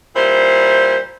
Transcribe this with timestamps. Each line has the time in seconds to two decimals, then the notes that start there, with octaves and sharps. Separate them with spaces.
0.15 A#2 G3 E4 C5